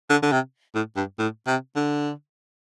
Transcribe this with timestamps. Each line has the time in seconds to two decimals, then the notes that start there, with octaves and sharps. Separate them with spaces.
0.10 D3
0.22 D3
0.32 C3
0.75 A2
0.97 G2
1.19 A2
1.47 C3
1.76 D3